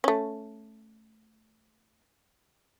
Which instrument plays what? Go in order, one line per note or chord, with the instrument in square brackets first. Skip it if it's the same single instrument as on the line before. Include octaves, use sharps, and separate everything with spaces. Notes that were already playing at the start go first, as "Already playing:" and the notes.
[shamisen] A3 C#4